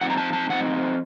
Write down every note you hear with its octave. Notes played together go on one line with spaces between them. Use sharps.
F3 C4 D#4 F#5
A#5
A5
A5
F3 C4 D#4 F#5